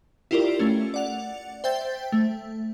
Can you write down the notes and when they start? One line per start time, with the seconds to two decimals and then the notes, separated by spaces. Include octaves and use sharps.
0.31 E4 F4 G4 A#4 D5
0.59 A3 C#4
0.94 D5 F#5 F7
1.64 C5 E5 G5 G6 A6
2.12 A3